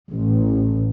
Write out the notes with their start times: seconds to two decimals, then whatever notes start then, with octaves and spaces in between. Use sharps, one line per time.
0.13 A1